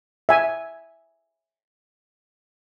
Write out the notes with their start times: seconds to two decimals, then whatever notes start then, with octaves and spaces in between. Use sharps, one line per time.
0.29 E5 G#5